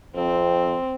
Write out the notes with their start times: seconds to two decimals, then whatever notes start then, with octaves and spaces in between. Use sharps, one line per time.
0.15 F2 C4